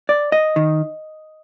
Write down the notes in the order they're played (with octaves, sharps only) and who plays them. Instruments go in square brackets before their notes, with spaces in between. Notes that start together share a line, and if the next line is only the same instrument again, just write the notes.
[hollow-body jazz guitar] D5
D#5
D#3